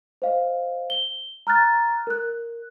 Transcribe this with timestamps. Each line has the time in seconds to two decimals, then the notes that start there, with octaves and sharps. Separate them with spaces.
0.22 C5 D#5 F5
0.90 G7
1.47 A#5 F6 F#6 A6
2.07 A#4 F#6